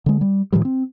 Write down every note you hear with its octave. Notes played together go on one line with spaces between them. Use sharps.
D3 G#3
G3
A2 D#3 F3 G3
C4